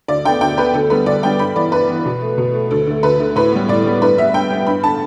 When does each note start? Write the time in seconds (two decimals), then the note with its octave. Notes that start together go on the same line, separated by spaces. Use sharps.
0.08 D2 D5
0.25 D3 B3 G5
0.41 D2 G5
0.57 D3 B3 B4
0.73 D2 A4
0.90 D3 G3 B3 B4
1.06 D2 D5
1.23 D3 G3 B3 G5
1.39 G2 B5
1.55 E3 B3 D5
1.72 G2 B4
1.89 E3 B3
2.05 B2
2.21 A3
2.38 B2
2.54 A3
2.71 D2 A4
2.87 D3 A3
3.03 D2 B4
3.19 D3 A3
3.36 A2 B4
3.52 G3 B3
3.68 A2 D5
3.85 G3 B3
4.01 G2 B4
4.18 G3 B3 E5
4.34 G2 G5
4.50 G3 B3
4.66 G2 B5
4.83 D3 B3 A5